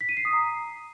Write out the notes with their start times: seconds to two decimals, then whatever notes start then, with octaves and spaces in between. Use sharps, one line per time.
0.01 B6
0.09 D#7
0.17 C7
0.25 D#6
0.33 A#5